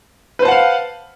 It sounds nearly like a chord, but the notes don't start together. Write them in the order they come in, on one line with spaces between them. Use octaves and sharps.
B4 C5 A5 F#5 F5